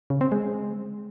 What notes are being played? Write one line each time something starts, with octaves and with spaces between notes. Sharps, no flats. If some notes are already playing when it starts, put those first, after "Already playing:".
C#3
C4
G#3